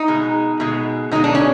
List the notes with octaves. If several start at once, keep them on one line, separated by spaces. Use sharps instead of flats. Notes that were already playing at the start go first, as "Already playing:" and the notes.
Already playing: D#4
B2 G#3
B2 G#3
B2 G#3 D#4
D4
C#4